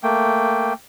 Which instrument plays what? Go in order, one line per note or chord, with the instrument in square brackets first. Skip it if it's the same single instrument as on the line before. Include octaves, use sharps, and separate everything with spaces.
[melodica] A3 A#3 G5